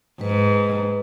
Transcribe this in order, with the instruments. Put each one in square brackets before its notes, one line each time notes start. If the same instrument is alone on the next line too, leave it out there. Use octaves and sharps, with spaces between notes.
[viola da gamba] G#2 [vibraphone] B4